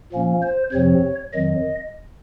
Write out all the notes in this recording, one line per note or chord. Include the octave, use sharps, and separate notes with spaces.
A#2 F3 A#3 C#4
C5
F2 C3 F3 C4 C#5
F2 D#3 F#3 D#5